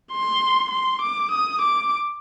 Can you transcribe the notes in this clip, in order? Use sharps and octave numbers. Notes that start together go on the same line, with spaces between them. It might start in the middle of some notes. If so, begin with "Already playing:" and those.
C6
C6
D6
D#6
D6